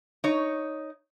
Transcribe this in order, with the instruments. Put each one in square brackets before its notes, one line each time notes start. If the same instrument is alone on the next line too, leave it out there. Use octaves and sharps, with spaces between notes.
[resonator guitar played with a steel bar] D#4 C#5